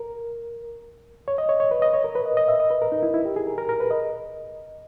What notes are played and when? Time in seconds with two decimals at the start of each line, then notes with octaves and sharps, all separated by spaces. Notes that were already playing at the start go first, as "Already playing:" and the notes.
Already playing: A#4
1.28 C#5
1.38 D#5
1.49 C#5
1.60 C#5
1.71 B4
1.82 D#5
1.94 C#5
2.04 A#4
2.15 B4
2.26 D#5
2.37 D#5
2.48 E5
2.60 D#5
2.70 B4
2.82 A#4
2.92 D#4
3.03 E4
3.14 E4
3.25 G4
3.36 G#4
3.47 A#4
3.58 A#4
3.69 A#4
3.80 B4
3.91 D#5